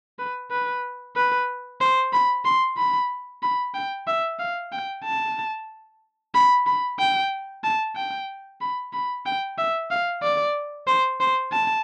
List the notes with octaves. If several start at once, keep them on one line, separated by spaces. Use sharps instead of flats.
B4
B4
B4
C5
B5
C6
B5
B5
G5
E5
F5
G5
A5
B5
B5
G5
A5
G5
B5
B5
G5
E5
F5
D5
C5
C5
A5